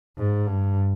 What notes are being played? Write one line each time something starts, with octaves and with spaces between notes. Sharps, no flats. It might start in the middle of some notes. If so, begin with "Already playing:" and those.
G#2
G2